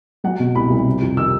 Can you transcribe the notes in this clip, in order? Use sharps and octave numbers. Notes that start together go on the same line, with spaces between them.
F#3 F#5
B2
C2 B5
C2
C3
F2
D#3 E6